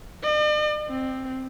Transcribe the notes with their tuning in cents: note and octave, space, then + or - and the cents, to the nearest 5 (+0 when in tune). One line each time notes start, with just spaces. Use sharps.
D5 +45
C4 +5